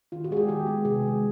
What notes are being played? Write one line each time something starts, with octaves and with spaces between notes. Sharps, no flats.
D#3 F4
F#4
G#3 B3 G#4
G4
D#3 G4
G#3 B3
C3 G#4
D#3 G#3